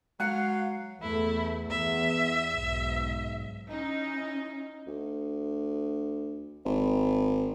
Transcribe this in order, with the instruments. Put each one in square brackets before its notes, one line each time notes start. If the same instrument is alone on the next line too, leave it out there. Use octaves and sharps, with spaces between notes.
[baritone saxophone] F#3 [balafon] G#3 [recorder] F5 [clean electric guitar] F#5
[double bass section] E2 A3 [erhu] E4
[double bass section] E2 [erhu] E5
[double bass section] B1 G#2
[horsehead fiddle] C#4 E4 [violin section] D#4
[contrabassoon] D2
G#1